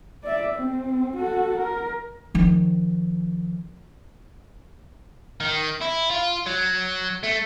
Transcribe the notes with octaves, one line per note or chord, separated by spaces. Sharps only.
D5 E5
C4
F#4 A4
A#4
D#3 F3
D#3
E4
F4
F#3
A3